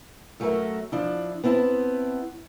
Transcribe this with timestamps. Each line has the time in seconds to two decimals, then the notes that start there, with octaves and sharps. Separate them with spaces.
0.40 F#2 A3 F#4 G#4 A#4 E5
0.92 F3 D4 E4
1.44 B3 C4 E4 E5 A5